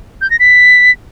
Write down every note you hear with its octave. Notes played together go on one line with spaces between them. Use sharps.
G6
A#6
B6